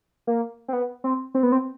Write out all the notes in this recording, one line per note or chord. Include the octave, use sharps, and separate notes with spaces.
A#3
C4
B3
C4
C4
B3
C4